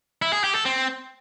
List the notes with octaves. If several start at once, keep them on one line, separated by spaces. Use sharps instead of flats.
E4
G#4
G4
A4
C4